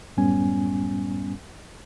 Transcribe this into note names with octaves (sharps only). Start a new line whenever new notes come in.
F#2 A2 G3 B3 C#4 G#5